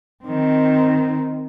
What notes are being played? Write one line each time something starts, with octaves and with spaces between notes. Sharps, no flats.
D#3 C4